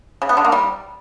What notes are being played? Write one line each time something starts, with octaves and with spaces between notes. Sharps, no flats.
C#3
B3
D3
A#3
G3